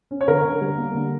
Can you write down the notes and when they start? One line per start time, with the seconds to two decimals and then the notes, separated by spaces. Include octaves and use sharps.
0.11 C#4
0.21 C#5
0.28 D3 A#4
0.45 D3
0.61 G3
0.78 A#3
0.95 D3